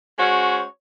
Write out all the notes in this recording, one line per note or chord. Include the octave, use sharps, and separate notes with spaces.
G#3 C#4 F#4 C5 C#5